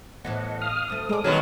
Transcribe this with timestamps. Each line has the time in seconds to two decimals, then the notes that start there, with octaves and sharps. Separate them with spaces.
0.25 A2 E3 B3 D#5 F#5
0.61 F5 D#6 F6
0.90 D2 A3 D#6
1.09 G#3 A#4 D5
1.24 B2 D#3 F#3 F6